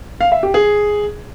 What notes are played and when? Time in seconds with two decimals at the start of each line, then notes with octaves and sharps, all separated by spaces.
0.21 F5
0.32 E5
0.43 G4
0.54 G#4